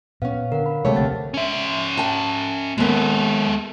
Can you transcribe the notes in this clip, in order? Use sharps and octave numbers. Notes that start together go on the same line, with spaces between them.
A#2 B3 C#4 F5
D3 A#4 F5 F#5
B5
C3 D#3 G#3 A3 C#5
D#1 A#1 D3 C4 F#5 A6
C#4 E5
G5 A5
D#2 G#3 B3 A4